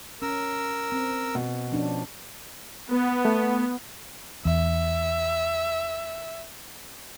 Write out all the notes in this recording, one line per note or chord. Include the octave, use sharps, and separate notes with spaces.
C#4 A#4 E6
C4
B2
F3 C#4 D4
B3
A3
E2 E5